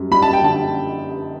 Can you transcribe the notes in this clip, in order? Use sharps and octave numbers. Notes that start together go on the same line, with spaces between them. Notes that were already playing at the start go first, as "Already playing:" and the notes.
Already playing: F#2 G3
G3 B5
A5
G5
D3 A5